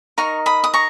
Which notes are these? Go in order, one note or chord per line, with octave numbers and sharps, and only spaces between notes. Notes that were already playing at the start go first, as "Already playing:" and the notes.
D#4 A#4 D#5 A#5 C#6
B5 D#6
D#6
A#5 C#6